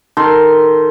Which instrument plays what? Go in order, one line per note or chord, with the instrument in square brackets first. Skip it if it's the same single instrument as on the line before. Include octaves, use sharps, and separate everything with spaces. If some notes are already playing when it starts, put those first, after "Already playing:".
[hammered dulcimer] D#3 A4 C6